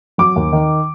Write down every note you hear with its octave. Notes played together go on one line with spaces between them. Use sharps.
F#3 D6
D#2
D#3